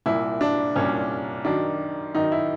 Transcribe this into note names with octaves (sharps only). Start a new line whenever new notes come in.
C2 A#2 E4
D4
C2 A#2 C#4
F#2 D#3 D4
F#2 D#3 D#4
E4